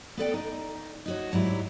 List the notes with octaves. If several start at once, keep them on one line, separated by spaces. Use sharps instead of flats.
B3 A4 D5 G5
D#4
D#4 F#4 C#5
G#2 F#3 G3 E4